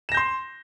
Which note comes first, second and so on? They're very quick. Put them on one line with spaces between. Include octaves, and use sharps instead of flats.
E7 A#6 G6 C6